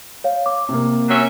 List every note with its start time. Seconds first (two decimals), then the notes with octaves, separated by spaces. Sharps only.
0.24 C#5 F5
0.46 D6
0.69 C3 A#3
1.08 F#3 C#4 E5